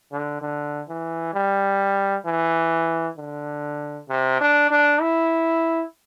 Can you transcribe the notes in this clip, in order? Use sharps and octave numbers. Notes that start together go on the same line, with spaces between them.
D3
D3
E3
G3
E3
D3
C3
D4
D4
E4